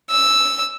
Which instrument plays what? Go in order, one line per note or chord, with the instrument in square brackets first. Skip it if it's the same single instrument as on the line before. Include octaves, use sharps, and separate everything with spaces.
[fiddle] E6